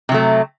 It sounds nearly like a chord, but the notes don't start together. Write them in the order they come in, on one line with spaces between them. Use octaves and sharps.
C3 F#3 A3